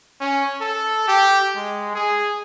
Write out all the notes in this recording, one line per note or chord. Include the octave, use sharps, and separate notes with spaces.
C#4
A4
G4
G#3
G#4